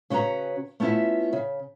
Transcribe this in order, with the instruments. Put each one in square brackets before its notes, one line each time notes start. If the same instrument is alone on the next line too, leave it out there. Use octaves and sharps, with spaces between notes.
[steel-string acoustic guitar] C#3 C#4 F#4 B4 A#5
A3 B3 C#4 E4 F4 E5
C#3